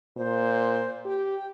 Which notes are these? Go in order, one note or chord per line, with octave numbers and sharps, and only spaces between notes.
A#2 C5
G4 G5